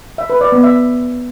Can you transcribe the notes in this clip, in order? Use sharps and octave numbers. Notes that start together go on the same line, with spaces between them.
E5
B4
D5
B3
E5